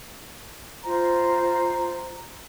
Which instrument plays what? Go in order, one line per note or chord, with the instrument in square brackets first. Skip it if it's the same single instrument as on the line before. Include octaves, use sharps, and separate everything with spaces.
[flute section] F4 C5 A#5